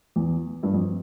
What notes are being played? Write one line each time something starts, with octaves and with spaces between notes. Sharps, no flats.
E2
G2
F2